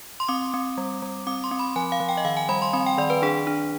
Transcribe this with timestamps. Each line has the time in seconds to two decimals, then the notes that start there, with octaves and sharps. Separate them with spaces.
0.20 C6
0.28 C4 D6
0.54 C4
0.78 G3
1.02 G3
1.27 C4 D6
1.44 C6
1.51 C4
1.59 B5
1.76 F3 G#5
1.92 F5
2.00 F3
2.09 G5
2.17 D#5
2.25 D#3 F5
2.37 G#5
2.49 G3 B5
2.62 C6
2.73 C4 B5
2.86 G5
2.98 D#3 D5
3.10 B4
3.22 D4 G#4
3.47 D4